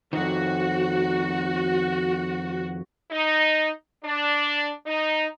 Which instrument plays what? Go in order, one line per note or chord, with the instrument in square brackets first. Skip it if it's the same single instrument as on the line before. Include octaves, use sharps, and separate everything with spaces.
[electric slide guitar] F2 D#3 [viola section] F#4
[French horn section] D#4
D4
D#4